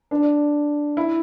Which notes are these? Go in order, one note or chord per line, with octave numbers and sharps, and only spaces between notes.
D4
E4